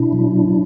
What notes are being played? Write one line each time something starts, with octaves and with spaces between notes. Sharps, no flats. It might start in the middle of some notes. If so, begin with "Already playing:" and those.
Already playing: B2 D4 E4
F#3